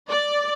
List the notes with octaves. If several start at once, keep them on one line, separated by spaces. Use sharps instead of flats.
D5